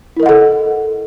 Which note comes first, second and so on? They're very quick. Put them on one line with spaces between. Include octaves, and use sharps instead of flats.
E4 A#4 D#5 F#5 A4